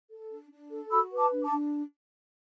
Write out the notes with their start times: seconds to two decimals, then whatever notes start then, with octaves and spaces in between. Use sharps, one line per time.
0.10 A4
0.31 D4
0.52 D4
0.70 A4
0.91 F#4 B5 E6
1.11 B4
1.17 A5 D6
1.31 D4
1.44 A5 D6
1.51 D4